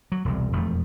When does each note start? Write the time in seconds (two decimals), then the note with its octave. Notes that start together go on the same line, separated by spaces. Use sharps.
0.12 F#3
0.25 E1 C2
0.52 E1 F2 A3